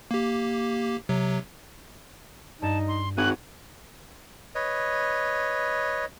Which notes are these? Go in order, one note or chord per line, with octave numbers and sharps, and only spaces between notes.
A#3 G4
C3 F#3
G2 D#4 A5
C6
G#1 F#4 F#6 G#6 D#7
B4 C#5 D#5